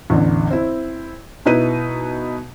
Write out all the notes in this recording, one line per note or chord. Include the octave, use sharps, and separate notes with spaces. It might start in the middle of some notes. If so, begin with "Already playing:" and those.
A1 E2 D3
C4 E4
B2 D#4 E4 B4 D#7